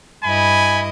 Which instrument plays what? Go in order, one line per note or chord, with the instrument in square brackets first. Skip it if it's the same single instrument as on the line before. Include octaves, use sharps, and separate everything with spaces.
[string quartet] G2 E4 D#5 [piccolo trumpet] G#5 [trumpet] B5